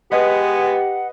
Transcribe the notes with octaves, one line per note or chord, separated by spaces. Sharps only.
G#3 B3 G4 B4 D#5 F#5